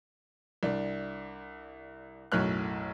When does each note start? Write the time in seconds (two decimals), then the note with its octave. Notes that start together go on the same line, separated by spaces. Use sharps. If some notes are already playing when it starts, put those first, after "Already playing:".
0.63 C2 D4
2.32 B1 F#2 A2 C#5 F6 F#6